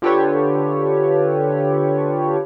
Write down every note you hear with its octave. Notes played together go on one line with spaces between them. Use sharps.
D3 F4 G4 A4 B4 C#5